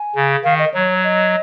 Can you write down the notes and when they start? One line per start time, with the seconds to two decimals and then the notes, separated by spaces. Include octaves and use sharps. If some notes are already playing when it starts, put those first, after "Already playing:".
Already playing: G#5
0.15 C#3
0.44 D#3 F5
0.59 D#5
0.74 F#3 C#5
1.04 D#5